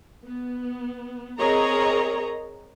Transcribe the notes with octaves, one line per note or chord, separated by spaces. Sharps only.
B3
C4 G#4 A#4 C#5 D#5 A#5